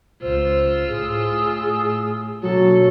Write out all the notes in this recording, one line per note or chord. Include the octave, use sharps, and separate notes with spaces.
C#2 F4 C5 E6
A2 G#4
B2 D3 F#3 A#3 A4 C#5